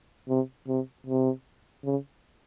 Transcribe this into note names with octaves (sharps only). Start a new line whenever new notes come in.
C3
C3
C3
C#3